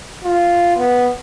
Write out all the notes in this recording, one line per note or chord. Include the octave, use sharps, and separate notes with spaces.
F4
B3